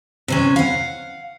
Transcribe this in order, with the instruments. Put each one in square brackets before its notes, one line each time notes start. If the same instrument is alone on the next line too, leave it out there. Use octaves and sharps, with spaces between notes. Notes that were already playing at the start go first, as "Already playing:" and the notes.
[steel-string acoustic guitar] C3 E3 C#4
F5 F#5